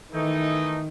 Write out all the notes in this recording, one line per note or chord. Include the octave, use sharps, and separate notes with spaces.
D#3 E3 A3 D#4